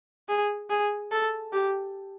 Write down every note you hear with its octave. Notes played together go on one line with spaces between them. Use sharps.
G#4
G#4
A4
G4